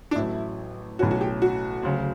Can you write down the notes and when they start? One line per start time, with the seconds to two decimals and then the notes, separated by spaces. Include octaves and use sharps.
0.11 D4
0.15 A1 A2 F#3 A3 E4
0.99 B1 A2 F#3 C#4 F#4
1.11 F#4
1.21 G4
1.42 F#4
1.83 D2 C#3 F#3